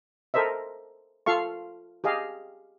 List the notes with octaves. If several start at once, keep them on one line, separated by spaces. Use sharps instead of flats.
A4 A#4 C5 D#5 E5
F4 A4 F5 C#6
G4 G#4 D#5 F5